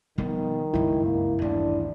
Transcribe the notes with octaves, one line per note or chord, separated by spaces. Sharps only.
B2 D#3 F3 G3 A#3 B3
F#1 C#2 G2 E3 E4
A#3
A1 D#2 G3 D4